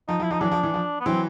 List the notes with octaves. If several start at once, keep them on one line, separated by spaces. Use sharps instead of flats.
F3 D#4
F3
E4
F3 D#4
E3 F#3 D4
F3
E3
F3
B3
E3 F#3 C4